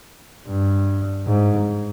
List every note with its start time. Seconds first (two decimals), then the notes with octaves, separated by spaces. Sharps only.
0.48 G2
1.27 G#2